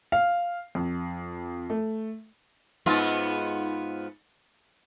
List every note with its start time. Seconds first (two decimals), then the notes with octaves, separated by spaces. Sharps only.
0.12 F5
0.75 F2
1.70 A3
2.86 G#2 B3 F4